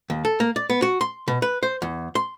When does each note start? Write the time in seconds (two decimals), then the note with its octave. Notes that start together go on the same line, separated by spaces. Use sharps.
0.10 D#2
0.25 A4
0.40 A#3
0.56 D5
0.70 B3
0.82 F#4
1.01 C6
1.28 B2
1.42 B4
1.63 C5
1.82 E2
2.15 C6